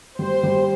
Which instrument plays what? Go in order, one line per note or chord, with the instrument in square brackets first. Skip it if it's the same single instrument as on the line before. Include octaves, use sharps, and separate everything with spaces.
[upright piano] G3 [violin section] C5
[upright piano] G3